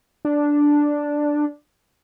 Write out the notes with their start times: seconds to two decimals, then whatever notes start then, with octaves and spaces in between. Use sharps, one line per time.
0.25 D4